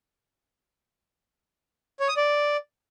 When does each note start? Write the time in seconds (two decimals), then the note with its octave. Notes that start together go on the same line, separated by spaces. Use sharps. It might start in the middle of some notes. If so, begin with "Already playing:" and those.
2.00 C#5
2.08 D#6
2.17 D5